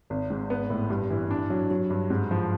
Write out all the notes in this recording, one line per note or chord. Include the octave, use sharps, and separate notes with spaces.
G#1
G#2
B3
A2
G2
E3
D4
F#3
F#3
G2
G#2
F3